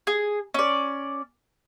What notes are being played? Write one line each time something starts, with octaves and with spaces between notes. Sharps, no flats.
G#4
C#4 D5